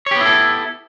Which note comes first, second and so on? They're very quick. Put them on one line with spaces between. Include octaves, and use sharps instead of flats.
C#5 G4 B3 E4 A4